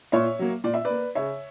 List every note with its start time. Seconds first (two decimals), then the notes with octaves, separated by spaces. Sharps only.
0.12 A#2 C#5 E5
0.39 F#3 A#3
0.64 A#2 D5
0.74 E5
0.85 B4 D5
0.90 A#3
1.15 C#3 C#5 E5